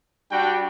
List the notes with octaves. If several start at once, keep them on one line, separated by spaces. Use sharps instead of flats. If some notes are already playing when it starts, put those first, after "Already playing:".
G3 D4 F#4 G5